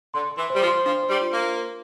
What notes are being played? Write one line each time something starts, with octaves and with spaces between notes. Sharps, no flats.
D3 C6
C6
E3
G3 C5
F3
C6
F3 D4
C5
G3
F4
A#3
F4
A#4